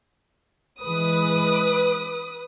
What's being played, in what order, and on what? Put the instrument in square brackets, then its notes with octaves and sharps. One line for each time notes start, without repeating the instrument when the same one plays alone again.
[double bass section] E3 G#3 [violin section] B4 D#6